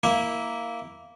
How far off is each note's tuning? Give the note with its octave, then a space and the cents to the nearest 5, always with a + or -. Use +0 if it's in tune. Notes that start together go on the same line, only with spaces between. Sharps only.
A#3 +0 E4 -10